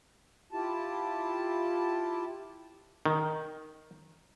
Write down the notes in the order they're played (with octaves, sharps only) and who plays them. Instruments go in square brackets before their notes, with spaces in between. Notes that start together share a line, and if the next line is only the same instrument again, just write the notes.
[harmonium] E4 F4 G4 A5
[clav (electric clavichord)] D#3